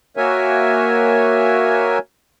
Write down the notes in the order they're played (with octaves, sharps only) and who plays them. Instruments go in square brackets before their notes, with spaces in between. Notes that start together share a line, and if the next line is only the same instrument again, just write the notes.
[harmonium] A#3 F#4 A#4 C#5 E5 G#5